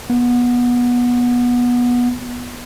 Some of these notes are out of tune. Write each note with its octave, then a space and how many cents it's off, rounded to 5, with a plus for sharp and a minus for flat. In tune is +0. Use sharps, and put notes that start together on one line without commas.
B3 -20